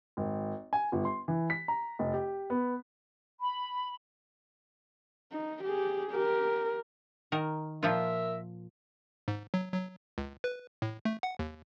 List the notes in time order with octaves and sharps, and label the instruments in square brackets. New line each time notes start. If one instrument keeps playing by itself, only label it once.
[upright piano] G#1
G#5
G1
C6
E3
B6
A#5
F1
G4
B3
[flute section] B5
[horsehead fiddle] D#4
G4 G#4
G4 A#4
[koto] D#3 A#4
[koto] A#2 F3 F4 [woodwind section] A#4 E5
[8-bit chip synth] G#2
F#3
F#3
C#2
B4
A2
A3
F#5
D#2